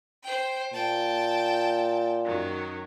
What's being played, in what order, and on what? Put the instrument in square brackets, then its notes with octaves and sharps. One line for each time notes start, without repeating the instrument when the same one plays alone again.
[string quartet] C5 G5
[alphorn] A#2 [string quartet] G5 A5
[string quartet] F#2 D#3 F#3